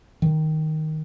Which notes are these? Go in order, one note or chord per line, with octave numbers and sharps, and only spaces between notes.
D#3